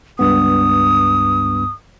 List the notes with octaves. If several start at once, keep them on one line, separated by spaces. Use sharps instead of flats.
C#2 G2 B3 D#6